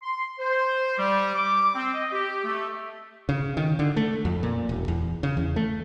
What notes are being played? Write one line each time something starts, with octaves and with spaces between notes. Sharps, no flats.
C6
C5
G3
D6
C4
D#5
G4
A3
C#3
D#3
D3
A3
F2
A#2
E1
E2
C#3
E2
A3